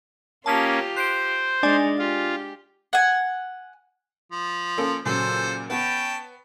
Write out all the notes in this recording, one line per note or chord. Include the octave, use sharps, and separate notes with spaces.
A#3 C#4 F4 G4 A5 D#6 B6
C5 F#6 C7 D7
G#3 D4 D#4 D5 G#5
F4 G4
F#5 G#5
F3
A#3 C#4 A4
A#2 C#3 F#3 A4 C5
B3 C#4 G5 A5